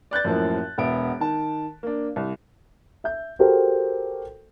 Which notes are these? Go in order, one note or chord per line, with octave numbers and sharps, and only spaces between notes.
D5 F#6 G6 A6
F#2 A2 F3 A#3
E1 B3 E5 D7
D#3 A5
A#3 D4
C2
E5 G6
F#4 G4 A4 A#4 C5 G5